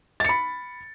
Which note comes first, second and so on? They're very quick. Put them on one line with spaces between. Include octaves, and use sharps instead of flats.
A6 C#7 B5